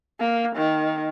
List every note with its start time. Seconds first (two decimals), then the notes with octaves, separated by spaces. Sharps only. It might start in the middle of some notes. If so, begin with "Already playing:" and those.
0.20 A#3
0.56 D#3